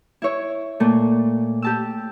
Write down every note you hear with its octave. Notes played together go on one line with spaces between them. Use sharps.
E4 C#5
A#2 A3
G4 A5 E6